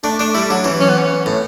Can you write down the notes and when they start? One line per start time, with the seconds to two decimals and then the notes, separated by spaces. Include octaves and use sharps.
0.04 A3 D4
0.19 A3 D4
0.34 G3 E4
0.50 F#3 D4
0.64 E3 C#4
0.80 C#4
0.90 B3
0.98 C#4
1.26 A2